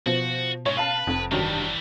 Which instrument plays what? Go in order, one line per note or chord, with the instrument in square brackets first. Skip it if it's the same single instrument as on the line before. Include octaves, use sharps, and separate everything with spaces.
[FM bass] B2 [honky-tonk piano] F3 [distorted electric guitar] F#4
[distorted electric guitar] G#2 [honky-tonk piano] C#5
[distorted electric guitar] B4 [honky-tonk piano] F5 A5
[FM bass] F1 [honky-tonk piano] F2
[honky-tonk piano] G2 D#3 F#3 [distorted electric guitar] E3 G3